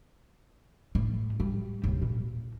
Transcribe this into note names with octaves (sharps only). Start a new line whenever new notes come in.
A2
G3
D#2 C#3
A#2